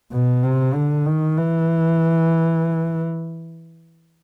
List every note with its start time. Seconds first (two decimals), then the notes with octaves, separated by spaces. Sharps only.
0.12 B2
0.44 C3
0.74 D3
1.06 D#3
1.37 E3